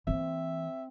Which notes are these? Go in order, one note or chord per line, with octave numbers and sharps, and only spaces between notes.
E3 A#3 C4 E5